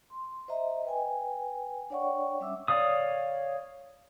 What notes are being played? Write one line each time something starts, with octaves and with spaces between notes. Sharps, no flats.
C6
C5 D#5 E5 A#5
B4 G5 G#5
D4 C#5 D5 F#5 G5 C#6
G3 C#4 E5 D6 E6
C#5 D5 F5 D#6